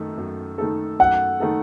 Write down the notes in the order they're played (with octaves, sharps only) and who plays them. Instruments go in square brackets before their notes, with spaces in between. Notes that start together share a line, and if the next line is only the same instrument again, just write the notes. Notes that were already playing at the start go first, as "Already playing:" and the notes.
Already playing: [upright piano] F#2 D#3 A3 D#4 A4
F#2
D#3 A3 D#4 A4
[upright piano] F#2 [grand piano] F#5
[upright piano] D#3 A3 D#4 A4